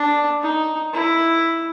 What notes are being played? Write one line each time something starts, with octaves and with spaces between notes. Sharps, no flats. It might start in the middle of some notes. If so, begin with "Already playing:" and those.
Already playing: D4
D#4
E4